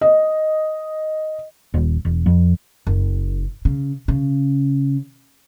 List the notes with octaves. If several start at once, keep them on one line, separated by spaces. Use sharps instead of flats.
D#5
D#1
E1
F2
F#1
C#3
C#3